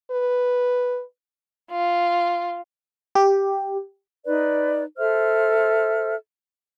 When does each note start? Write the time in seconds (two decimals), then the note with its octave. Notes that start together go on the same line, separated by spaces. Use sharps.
0.11 B4
1.71 F4
3.15 G4
4.24 D#4 B4 D5
4.97 A4 C5 E5 F6